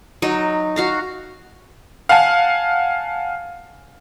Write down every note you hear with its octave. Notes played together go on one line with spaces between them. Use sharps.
F#3 D#4
F#4 F5 A#5
F5 F#5 G#5 A5